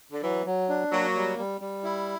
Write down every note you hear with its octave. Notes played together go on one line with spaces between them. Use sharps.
D3
E3 F#3
F#3
D4
F#3 A#3
G3
G3
G3
E4